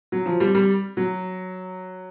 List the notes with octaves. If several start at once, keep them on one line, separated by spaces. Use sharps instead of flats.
F#3
F3
G3
G3
F#3